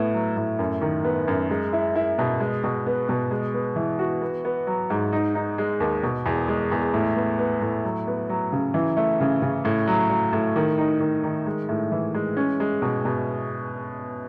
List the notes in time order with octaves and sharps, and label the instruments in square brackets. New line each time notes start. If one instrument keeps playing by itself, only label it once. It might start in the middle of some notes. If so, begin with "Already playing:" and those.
Already playing: [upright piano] A2 B3
F#3
A2
F#2
D#3
B3
F#2
G#3
E4
E4
B2
G#3
B2
B3
B2
G#3
B3
E3
F#4
B3
B3
F#3
G#2
D#4
D#4
G#3
D#2
B2
E2
G#3
E2
A2
B3
B3
A2
F#3
B3
F#3
C#3
E3
A3
C#3
C#3
A2
F#3
F#3
A2
D#3
D#4
D#3
D#3
G#3
A2
E3
G#3
C#4
G#3
B2
B2